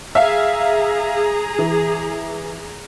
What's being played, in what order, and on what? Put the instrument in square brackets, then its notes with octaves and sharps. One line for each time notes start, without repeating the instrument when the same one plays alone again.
[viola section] G#4 A#5 [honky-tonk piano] E5 F5
[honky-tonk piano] E3